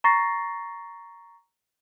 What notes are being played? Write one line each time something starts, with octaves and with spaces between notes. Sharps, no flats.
A#5 C#6 A6 A#6 C7